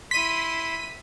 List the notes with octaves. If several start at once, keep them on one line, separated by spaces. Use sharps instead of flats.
E4 C6 B6 D#7